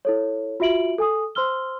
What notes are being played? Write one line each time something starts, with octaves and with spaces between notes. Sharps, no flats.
E4 A4 C#5
F4 F#4 E5 D7 F#7
A4 G#5 D#6
C5 C6 E6 F6 G7